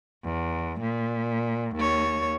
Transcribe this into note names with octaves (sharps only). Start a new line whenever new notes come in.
E2
A#2
D#2 C#5